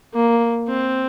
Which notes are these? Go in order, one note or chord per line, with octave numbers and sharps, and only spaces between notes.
A#3
C4